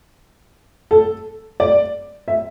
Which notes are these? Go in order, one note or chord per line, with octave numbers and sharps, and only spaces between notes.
A4
D5
E5